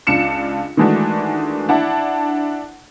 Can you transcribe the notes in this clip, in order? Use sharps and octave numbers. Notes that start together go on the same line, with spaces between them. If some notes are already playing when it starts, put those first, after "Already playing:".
C#2 D4 F4 C#7 E7
D#3 E3 G#3 A3 D4 F#4
D4 E4 F#5 A5